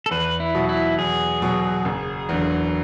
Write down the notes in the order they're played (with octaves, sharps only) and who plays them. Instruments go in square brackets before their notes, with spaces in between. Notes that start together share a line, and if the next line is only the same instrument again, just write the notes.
[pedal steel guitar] A4
[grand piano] E2 [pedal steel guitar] B4
[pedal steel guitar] E4
[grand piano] B2 F#3
[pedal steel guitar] E4
[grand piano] E2 [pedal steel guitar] G#4
[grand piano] B2 F#3
F#1
E2 D3 F#3